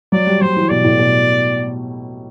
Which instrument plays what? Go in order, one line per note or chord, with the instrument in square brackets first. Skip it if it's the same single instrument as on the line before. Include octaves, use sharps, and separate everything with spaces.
[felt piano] F#3 [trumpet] D5
[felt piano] G3
[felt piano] F#3 [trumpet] C5
[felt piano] E3
[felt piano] B2 [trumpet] D5
[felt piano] A2
B2